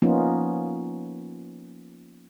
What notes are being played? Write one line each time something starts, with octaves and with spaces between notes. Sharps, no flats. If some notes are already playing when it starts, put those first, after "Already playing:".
F3 A#3 B3 C#4 D#4 F4